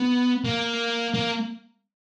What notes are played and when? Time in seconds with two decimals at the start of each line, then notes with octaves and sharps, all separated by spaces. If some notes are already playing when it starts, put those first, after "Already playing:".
Already playing: B3
0.44 A#3
1.14 A#3